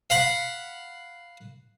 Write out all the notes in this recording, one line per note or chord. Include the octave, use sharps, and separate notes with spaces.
F5 F#5 B5